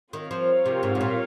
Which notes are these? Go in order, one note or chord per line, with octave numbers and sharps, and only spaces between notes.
D#3 C4 F4 A#4 C#5 F5
F3
C3
G#2
C3
A#2